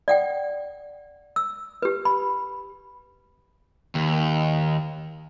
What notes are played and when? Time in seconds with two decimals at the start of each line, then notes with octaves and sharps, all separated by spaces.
0.08 D5 F#5 G5
1.36 E6
1.82 G4 B4
2.05 B5
3.95 D#2